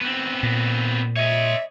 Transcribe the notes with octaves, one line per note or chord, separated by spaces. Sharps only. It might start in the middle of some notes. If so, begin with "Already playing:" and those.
B3 C4
A#2
C#5 D#5 E5